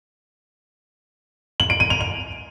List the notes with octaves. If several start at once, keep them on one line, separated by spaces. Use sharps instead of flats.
F#7
D7
D#7
F7
F7